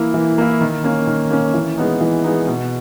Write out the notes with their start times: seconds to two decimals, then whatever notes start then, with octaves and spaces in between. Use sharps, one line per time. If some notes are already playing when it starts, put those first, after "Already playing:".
Already playing: E3 A#3 E4
0.14 E3
0.38 A#3 E4
0.61 D#3
0.84 A#3 C#4
1.07 D#3
1.31 A#3 C#4
1.54 E3
1.78 G#3 B3 D#4
2.01 E3
2.24 G#3 B3 D#4
2.47 B2